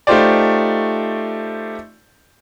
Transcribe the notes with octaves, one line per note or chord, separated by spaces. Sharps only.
A3 D#4 F4 G4 C5 D5